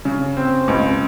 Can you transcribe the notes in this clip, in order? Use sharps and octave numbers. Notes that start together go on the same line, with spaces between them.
C#3
C4
C#2